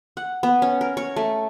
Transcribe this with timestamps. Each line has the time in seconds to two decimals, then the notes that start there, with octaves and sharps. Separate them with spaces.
0.17 F#5
0.43 B3
0.62 C#4
0.81 A#4
0.97 C#5
1.16 A3